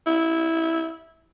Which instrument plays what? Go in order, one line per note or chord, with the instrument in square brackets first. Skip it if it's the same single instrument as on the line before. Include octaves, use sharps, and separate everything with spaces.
[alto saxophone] E4